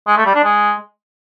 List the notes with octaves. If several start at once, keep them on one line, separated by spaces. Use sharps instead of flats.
G#3
A3
G3
D4
G#3